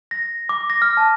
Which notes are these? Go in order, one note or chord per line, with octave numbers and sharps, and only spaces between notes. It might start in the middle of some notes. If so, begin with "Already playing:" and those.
A#6
D6
A#6
F6
A5